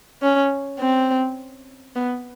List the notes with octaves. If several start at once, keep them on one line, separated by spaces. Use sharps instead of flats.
C#4
C4
B3